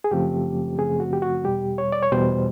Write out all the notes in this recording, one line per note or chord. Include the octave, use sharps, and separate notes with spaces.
G#4
F#2 C#3 F3 A3 C4 G4
F#2 C#3 F3 A3 C4 G#4
F#4
G4
F#4
E2 B2 G3 G4
C#5
D5
C#5
E2 B2 G3 C5